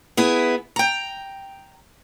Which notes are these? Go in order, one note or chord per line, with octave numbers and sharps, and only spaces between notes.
B3 E4 G#4
G5 A#5